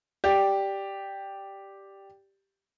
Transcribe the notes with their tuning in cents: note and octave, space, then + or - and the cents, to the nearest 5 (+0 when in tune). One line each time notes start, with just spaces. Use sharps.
G4 +0 D5 +0